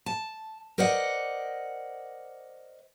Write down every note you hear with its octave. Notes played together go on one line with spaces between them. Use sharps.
A5
A#4 C5 D5 D#5 F#5